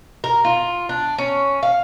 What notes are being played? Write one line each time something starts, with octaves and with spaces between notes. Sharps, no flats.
A#4
F4
D4
C#4
F5